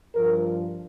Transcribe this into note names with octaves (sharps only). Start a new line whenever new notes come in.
G2 F3 A#4